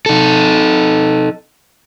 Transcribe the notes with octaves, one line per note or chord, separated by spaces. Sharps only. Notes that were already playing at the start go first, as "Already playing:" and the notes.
D#4 A4